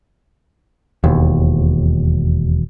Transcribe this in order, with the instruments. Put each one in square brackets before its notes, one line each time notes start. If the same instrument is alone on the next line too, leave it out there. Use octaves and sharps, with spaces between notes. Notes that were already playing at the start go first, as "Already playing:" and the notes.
[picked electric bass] E1 D#2